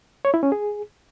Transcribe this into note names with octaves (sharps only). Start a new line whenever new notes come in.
C#5
E4
C#4
G#4